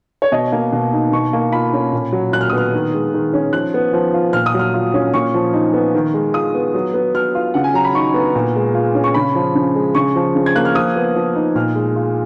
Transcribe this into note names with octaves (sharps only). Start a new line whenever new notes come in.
C#5
B2 D#5
A#3
B2
D#4
B2 C#6
A#3
F4 B5
C#4
A#2
F#3
A#2 F#6
F6
D#6
B3 F6
D#3
G#3
D#3
C#4
F3 F#6
B3
F3
F4
A#2 F6
D#6
F#3 F6
F4
C#4
A#2 C#6
F3
D#4
B3
D#3
G#3
F4 D#6
B3
F#3
B3
F#3 F6
F4
C#3 F#5
G#5
F#3 A#5
B5
D#4 C#6
B3
A#2
G#3
F4
C#4
C#6
C#3 B5
F3
C#3
G#3
C#3 C#6
F3
C#3
G#6
A#3 F#6
F6
F3 D#6
B3
F3
D#4
A#2 F6
G#3
F4